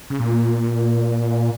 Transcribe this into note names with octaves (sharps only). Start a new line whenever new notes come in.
C#3
A#2